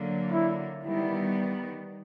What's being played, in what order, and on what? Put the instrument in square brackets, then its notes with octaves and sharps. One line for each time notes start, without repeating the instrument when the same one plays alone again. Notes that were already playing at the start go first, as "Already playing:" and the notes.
Already playing: [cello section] D3 F#3 A#3
[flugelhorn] E4
[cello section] D#3 G3 B3 [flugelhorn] E4